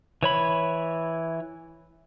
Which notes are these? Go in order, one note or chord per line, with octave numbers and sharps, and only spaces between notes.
E3 C#5 B5